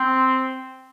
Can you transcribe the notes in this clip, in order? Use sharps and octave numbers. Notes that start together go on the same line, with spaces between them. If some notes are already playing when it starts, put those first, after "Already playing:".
Already playing: C4